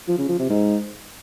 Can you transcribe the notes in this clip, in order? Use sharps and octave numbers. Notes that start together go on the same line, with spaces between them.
F3
C#3
F3
C3
G#2